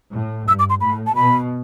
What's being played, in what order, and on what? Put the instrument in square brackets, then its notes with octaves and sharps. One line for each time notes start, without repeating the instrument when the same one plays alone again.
[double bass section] A2
[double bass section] G2 [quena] E6
[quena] D6
C6
[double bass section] A2 [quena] B5
[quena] A5
[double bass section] B2 [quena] B5